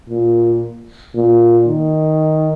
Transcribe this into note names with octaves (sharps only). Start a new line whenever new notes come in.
A#2
A#2
D#3